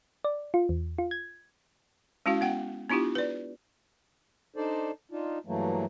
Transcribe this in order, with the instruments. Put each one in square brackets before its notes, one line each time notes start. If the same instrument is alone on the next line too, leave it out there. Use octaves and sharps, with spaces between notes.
[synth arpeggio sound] D5
F4
E2
F4
G#6
[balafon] G#3 C#4 E4 F#4 F5
B3 F#5 G5
B3 D4 E4 F4 G4
B4 D5
[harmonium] D4 D#4 A4 C5 D5
D4 D#4 F4
G2 E3 F#3 A3 A#3